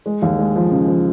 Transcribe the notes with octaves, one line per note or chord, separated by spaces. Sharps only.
G#3
D#2
G#3
F3
C#3
F3